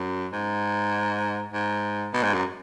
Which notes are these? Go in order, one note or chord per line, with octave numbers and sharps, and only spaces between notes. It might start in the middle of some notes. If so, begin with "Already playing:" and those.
Already playing: F#2
G#2
G#2
B2
G#2
F#2